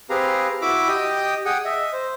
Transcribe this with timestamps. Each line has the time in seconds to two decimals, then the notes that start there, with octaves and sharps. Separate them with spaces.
0.10 C4 G4 G#4 B4 F5 A#5
0.62 E4 F#4 E5 B5 D6 E6
0.88 G4 D#5 G5 D#6
1.45 G#4 F#5 G5 D#6
1.65 D#5 E5
1.93 C5